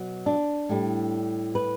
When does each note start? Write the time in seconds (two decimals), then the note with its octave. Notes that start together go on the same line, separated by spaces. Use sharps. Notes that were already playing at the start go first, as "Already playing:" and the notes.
Already playing: B2 F#3
0.26 D4
0.69 A2 G3
1.55 B4